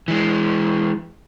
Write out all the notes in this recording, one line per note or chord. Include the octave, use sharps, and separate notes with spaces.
E3 G#3